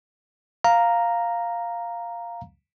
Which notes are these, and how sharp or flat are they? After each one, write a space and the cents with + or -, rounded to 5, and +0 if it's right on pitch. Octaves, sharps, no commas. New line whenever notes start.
F5 +0 A#5 +0